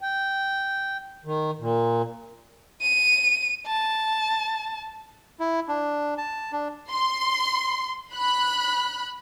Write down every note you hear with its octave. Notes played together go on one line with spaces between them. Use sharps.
G5
D#3
A#2
D#7
A5
E4
D4
A5
D4
C6
B5 F#6